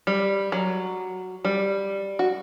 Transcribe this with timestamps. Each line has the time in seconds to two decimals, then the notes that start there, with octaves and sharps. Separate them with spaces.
0.07 G3
0.52 F#3
1.45 G3
2.19 F#4